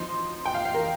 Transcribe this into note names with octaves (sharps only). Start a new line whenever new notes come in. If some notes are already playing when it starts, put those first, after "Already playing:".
Already playing: F3 D#4 C6
G5
F5
F5
A#4